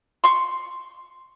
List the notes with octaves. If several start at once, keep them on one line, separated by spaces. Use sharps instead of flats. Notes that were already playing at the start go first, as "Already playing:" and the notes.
C6 C#6